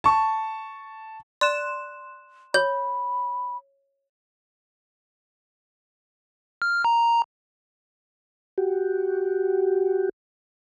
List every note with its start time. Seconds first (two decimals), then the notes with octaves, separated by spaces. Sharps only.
0.04 A5 C#6
1.41 D5 C6 F#6 E7
2.54 C#5 B5 G6
6.62 F6
6.85 A#5
8.58 F#4 G4